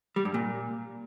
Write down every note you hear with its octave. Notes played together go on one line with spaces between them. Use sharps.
G3
G2
A#2